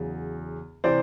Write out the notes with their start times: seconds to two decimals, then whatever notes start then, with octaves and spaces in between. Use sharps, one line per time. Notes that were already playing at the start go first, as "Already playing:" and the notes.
Already playing: E2 C#3 F#3
0.84 C3 E3 C5 D5